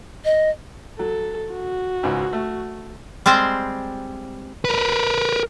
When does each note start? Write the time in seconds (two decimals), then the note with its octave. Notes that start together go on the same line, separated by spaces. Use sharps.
0.25 D#5
0.99 F#3 A4
1.54 F#4
2.03 C#2 G#2
2.33 A3
3.26 G3 G#3 C4 C5
4.65 A#4 B4